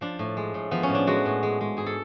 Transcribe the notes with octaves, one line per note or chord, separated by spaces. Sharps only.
F3 D4
A2
G#3
A2
F3 B3
C#4
A2
D4
G#3 F#4
A2
G#3
G#3
G#2 G#4
A4